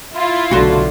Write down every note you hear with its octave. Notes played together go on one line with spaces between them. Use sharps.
E4 F4
B1 D3 F#4 C5